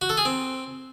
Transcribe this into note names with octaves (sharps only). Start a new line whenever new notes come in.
F#4
A4
G#4
C4